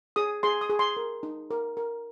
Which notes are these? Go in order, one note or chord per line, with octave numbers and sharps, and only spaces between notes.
G#4 D#6
G#4 C6
D#6
G#4
C6
A#4
D#4
A#4
A#4